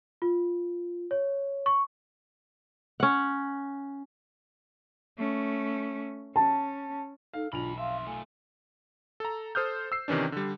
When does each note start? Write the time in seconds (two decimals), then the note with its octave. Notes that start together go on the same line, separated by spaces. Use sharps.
0.22 F4
1.11 C#5
1.66 C#6
3.00 C#4 F#5
5.18 A3 C#4
6.36 C#4 A5
7.34 D#4 A4 F5
7.53 B1 E2 D4 F4 B5 F7
7.78 F2 E5 F5 C6
8.07 A3 F4 G#5
9.20 A4 A#5
9.55 A4 C5 D#6 F6 G6
9.92 E6 C7
10.08 C3 D#3 E3 C#4 D4
10.32 D3 G3